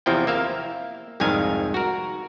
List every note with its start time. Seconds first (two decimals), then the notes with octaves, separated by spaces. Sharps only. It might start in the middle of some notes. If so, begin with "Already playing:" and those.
0.06 E2 C3 F3 E4 G5
0.27 A#3 E5 F5
1.20 C2 F2 G#2 D#3 F5 G#5
1.74 F#4 A#4